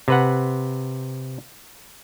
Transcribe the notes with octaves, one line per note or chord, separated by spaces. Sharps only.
C3 B4 F#5